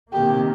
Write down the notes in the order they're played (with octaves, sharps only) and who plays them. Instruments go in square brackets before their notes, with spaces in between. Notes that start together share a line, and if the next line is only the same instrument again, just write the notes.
[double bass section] C3 D#3 A#3 [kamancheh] G4